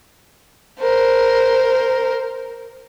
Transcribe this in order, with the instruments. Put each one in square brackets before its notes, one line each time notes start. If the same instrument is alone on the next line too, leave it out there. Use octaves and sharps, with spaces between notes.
[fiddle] A#4 C5